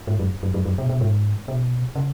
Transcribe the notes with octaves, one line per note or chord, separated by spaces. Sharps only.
G#2
F#2
F#2
F#2
F#2
B2
B2
G#2
B2
C#3